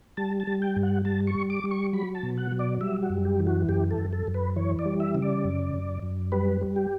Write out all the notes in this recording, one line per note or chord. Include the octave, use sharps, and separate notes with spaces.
G3 A5
A5
G3
G5
G2
F#5
G3 A5
C#6
G3
D6
G3
C#6
F#3 B5
A5
B2
F#5
F#3
D5
G3 E5
F#4
F#2
G4
E3
F#4
F#2 G4
A4
F#2
A4
F#2
B4
E3 C#5
D5
G3
E5
C#3
D5
F#2
F#2
F#2
G3 B4
G3
G4